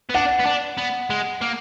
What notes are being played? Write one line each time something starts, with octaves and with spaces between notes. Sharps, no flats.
B3
D4 F#5
B3
D4
B3
G#3
A#3